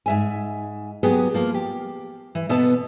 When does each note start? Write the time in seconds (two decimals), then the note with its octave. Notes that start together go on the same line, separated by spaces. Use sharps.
0.06 G#2 E5 G#5
1.03 F#3 B3 G4 G#4
1.34 F3 A#3
1.54 G4
2.35 E3
2.49 B2 B3 A4 B4 A5